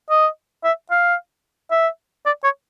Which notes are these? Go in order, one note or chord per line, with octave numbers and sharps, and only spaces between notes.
D#5
E5
F5
E5
D5
C#5